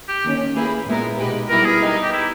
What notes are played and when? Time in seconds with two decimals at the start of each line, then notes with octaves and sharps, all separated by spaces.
0.09 G4
0.24 D#3 A#3 C#4
0.55 A#3 E4 G#4 B4
0.86 A#2 G#3 B3 E4 A#4
1.18 B2 G#3 D#4 G4 B4
1.49 G3 B3 E4 G4 A#4 B4
1.65 G#4
1.80 G3 B3 D#4 G4
2.03 G4
2.12 E4